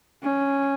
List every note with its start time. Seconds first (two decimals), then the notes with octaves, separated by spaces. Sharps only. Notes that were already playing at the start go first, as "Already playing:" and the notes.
0.22 C#4